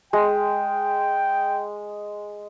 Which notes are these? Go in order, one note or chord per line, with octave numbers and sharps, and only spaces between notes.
G#3 G5